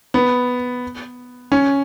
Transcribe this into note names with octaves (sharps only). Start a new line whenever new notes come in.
B3
C#4